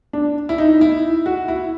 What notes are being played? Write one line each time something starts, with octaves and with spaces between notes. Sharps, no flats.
D4
E4
D#4
E4
F#4
E4